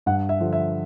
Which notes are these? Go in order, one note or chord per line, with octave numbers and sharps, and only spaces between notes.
G2 F#5
E5
D3 F3
E5